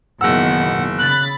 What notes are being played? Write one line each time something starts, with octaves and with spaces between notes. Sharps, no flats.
F#1 B2 D#3 E3 F#5 E6
C#3 B5 F#6 A6